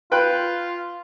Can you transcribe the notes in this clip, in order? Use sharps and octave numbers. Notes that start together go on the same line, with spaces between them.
F4 B4 G5 F#6